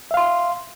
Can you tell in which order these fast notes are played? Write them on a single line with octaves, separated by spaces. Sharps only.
E5 F5 C6